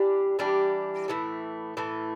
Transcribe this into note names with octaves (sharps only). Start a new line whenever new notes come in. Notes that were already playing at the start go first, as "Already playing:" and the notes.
Already playing: E3 G3 D4 G4
E3 G3 D4 G4
A2 E3 A3
A2 E3 A3